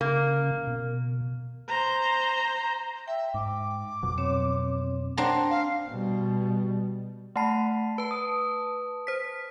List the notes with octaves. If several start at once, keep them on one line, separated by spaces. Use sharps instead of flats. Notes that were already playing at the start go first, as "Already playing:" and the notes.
C#3 A#3
B2
C5 A#5
E5 G5
G#2 D6
F2 B2 F#3
C4 C#5
C4 D4 F#5 A#5 C6
F5
B2 G3
A3 F#5 A5 B5 C7
B4 A5
D#6
C5 B6